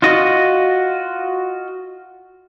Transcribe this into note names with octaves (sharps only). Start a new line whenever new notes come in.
F4 F#4 D#5